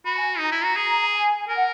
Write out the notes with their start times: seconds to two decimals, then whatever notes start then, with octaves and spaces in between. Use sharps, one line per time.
0.06 F#4 B5
0.18 G#5
0.39 D#4 A#5
0.52 E4
0.64 F#4
0.76 G#4
1.12 G#5
1.48 A#4 G#5
1.57 F#5